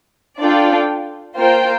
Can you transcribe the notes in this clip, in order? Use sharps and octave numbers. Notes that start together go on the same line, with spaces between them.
D4 F4 A4 D5 G5
A#3 F4 C5 G5